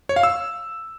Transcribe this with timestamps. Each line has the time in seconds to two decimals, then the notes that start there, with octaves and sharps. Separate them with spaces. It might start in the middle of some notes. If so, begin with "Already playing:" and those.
0.09 C#5
0.16 F5
0.23 E6